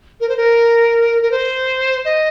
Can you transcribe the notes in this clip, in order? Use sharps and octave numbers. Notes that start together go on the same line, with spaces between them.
A#4
C5
A#4
A#4
C5
D#5